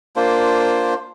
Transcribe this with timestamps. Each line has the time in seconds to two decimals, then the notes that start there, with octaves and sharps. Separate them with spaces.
0.16 A#3 D4 F4 C5